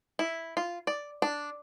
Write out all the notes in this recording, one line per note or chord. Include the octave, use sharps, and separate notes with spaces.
E4
F4
D5
D4